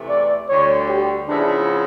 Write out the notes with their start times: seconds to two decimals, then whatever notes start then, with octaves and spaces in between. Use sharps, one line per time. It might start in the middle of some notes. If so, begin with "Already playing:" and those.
Already playing: E2 C3 E3 A3
0.09 D5
0.48 D2 D3 G3 C#5
0.88 G4
1.28 C#3 F3 G#3 B3 D4 E4